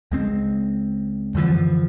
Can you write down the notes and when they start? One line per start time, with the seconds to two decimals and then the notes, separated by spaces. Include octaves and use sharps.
0.11 C#2 G#3 C4
1.35 F#2 D3 E3 F3